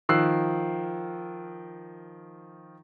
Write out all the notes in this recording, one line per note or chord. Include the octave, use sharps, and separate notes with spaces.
D#3 F3 E6 F#6 C7